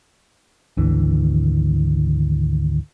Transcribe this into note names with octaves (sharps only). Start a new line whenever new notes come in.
G#1 D2 D3 E3